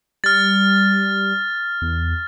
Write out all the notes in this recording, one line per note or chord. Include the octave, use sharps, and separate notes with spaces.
G3 F6 A6
E2